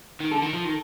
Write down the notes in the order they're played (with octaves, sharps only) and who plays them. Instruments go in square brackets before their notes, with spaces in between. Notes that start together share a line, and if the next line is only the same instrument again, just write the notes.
[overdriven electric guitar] D#3
[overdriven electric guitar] D3 [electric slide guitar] A4
[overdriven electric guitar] D#3
F3
D#3